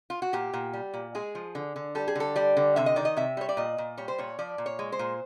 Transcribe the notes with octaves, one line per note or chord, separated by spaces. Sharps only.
F4
F#4
A#2 G4
A#2
G3
A#2
G#3 G#4
F3
D3
D3
G3 A4
G#4
D3 A4
G3 D5
D3
C3 E5
D#5
D#3 D5
D#5
C3 E5
G3 C#5
D5
A#2 D#5
A#2
G3 C#5
C5
A#2 C#5
F3 D5
A#2
C#5
G#3
C5
A#2